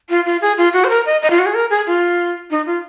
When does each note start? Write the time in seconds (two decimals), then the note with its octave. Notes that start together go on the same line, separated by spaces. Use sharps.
0.10 F4
0.26 F4
0.42 G#4
0.58 F4
0.73 F#4
0.84 C5
0.90 A#4
1.06 D#5
1.22 D#5
1.30 F4
1.39 F#4
1.46 G#4
1.54 A#4
1.70 G#4
1.87 F4
2.51 D#4
2.66 F4